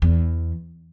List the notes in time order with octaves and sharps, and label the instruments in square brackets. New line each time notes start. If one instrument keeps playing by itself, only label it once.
[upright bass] E2